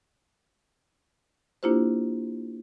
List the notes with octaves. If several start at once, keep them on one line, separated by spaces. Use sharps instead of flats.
A#3 D4 E4 F4 G4 C5